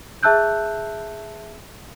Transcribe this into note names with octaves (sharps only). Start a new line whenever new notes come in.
G#4 E5 A5 E6 F#6 G6